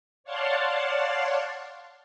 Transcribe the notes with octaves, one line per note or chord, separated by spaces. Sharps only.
C#5 D5 F5 F#5 A5 C6